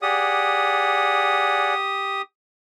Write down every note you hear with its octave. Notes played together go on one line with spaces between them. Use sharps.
G4 G#4 D5 F#5 D#6